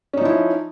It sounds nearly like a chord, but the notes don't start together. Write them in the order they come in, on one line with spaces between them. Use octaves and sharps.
C#4 D#4 F3 E4